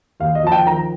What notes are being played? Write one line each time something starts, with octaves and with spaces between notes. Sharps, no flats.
D#2 F5
D#5
F3 A5
G5
D#3 A#5